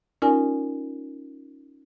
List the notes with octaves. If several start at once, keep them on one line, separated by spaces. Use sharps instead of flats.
C#4 D#4 F4 A#4 D5 G#5